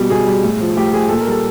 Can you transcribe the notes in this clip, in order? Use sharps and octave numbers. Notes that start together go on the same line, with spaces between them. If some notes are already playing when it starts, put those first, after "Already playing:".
Already playing: B2 G3
B2 G#4
G3
A2
F3
A2 G4
F3 G#4
A#2 A4
A#4
G3 A4